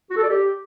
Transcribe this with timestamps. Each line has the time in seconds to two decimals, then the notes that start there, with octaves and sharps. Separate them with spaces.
0.10 F#4
0.17 A4
0.23 D5
0.29 G4